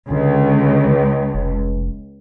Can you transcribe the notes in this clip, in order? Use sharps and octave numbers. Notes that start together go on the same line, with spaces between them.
C#2 D3
F1